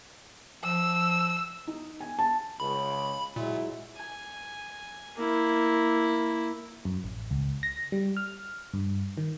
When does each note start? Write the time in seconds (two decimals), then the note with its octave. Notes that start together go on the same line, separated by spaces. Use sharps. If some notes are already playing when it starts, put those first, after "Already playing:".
0.64 F3 E6
1.67 D#4
2.00 G#5
2.19 A5
2.60 C#2 C#3 B5
3.36 A#2 F#3 G#3 E4
3.97 G#5
5.16 A#3 E4
6.85 F#2
7.04 A1
7.31 C#2
7.63 A#6
7.92 G3
8.17 F6
8.74 G2
9.18 D#3